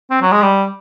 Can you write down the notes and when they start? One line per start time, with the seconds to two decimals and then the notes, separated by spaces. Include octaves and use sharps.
0.10 C4
0.21 F#3
0.32 G#3
0.42 G3